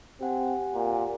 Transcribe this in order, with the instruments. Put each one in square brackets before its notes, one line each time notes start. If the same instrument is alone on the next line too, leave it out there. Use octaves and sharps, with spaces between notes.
[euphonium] C4 [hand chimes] G4 F#5 G#5
[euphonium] A#2